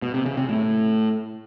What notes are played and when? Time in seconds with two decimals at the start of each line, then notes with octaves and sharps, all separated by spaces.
0.02 B2
0.14 C3
0.26 C#3
0.37 C3
0.49 A2